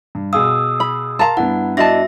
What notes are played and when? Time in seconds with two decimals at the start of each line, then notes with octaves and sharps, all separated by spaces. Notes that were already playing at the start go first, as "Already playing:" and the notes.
0.15 G2
0.33 B2 G#4 F5 D#6 E6
0.80 B5
1.19 A#4 F5 A5 A#5 C6
1.37 G2 B3 E4 F#5
1.77 D4 F#4 D#5 E5 A5 A#6